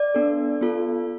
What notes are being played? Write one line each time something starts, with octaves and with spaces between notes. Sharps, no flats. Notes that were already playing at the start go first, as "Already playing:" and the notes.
Already playing: D5
B3 D4 A4
B3 F4 A4